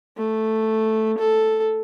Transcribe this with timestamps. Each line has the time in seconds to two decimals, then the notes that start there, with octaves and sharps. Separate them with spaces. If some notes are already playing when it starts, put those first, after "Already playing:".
0.17 A3
1.18 A4